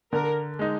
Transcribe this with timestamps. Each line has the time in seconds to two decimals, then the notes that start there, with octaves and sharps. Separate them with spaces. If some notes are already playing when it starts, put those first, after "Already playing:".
0.13 D3 A#4
0.59 G#3 D#4